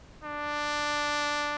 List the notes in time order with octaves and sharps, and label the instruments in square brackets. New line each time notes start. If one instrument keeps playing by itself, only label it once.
[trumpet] D4